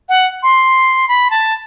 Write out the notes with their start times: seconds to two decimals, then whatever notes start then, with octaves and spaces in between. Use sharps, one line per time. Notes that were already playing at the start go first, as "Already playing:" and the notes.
0.09 F#5
0.43 C6
1.08 B5
1.31 A5